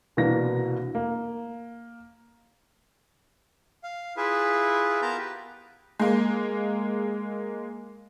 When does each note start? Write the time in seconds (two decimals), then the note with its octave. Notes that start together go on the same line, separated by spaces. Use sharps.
0.17 C2 B2 E3 A#3 D4 A#6
0.95 A#3
3.83 F5
4.17 E4 F4 G#4 B4 E5
5.02 B3 F4 A#4 A5 A#5 G6
5.17 G4 B4
5.99 G#3 A#3